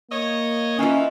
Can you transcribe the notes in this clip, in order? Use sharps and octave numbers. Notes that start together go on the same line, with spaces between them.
A#3 C#5 D#5
E3 C#4 D#4 F4